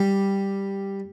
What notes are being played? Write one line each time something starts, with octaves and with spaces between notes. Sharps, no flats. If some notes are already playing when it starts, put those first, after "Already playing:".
Already playing: G3